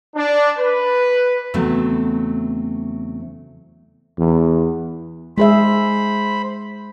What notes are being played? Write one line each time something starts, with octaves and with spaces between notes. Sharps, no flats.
D4
B4
E2 C#3 F#3 A3 C4
E2
G#3 G#4 C5 E5 B5